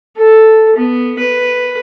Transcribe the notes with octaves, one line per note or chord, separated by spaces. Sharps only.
A4
B3
B4